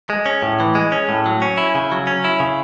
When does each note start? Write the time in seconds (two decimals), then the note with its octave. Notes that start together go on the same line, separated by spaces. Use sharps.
0.10 G#3
0.26 C#4
0.43 A2
0.60 E3
0.75 G#3
0.92 C#4
1.09 A2
1.26 F#3
1.42 C#4
1.58 E4
1.75 C#3
1.92 F#3
2.07 C#4
2.24 E4
2.40 C#3